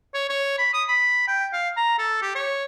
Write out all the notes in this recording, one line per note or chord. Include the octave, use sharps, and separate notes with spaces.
C#5
C#5
B5
D#6
B5
G5
F5
A#5
A4
G4
C#5